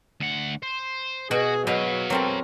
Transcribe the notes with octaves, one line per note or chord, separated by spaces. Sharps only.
D2 F#5
C5
B2 F#4 G#4
B2 F#3 B4 F5
F#3 C4 A4 A#4